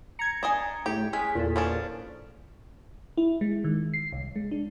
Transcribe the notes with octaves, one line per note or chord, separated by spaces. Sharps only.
A#5 G#6 C#7
D4 D#5 G#5
A2 G4
G#3 C#4 G#4 B6
E2 A#2 G#4 A4
F3 C#4 D4
E4
G#3
D#3
C7
C2
G#3
D4